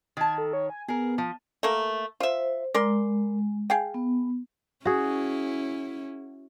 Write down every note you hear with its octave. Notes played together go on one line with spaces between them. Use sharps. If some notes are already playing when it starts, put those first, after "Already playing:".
D#3 A5 G#6
A4
C#5
G#5
B3 G#4 A#4
F3
A3 A#3 A#4
F4 C5 E5
G#3 A#4 D5 C6
G#4 F5 G5
B3
C#4 E4 F#4 G#4